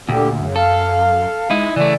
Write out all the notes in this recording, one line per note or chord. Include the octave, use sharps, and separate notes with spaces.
D2 A#2 D3 G4
F#2 C#3
A4 F5
G#3 D#4 E4
C#3 E3 A3 D5